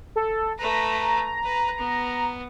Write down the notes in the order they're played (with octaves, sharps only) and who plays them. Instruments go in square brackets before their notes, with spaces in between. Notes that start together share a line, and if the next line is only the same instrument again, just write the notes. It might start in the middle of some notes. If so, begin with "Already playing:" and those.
[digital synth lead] A4
[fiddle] A3 B4 [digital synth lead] A#5
[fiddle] B4
B3